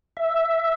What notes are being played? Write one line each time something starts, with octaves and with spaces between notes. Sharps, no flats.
E5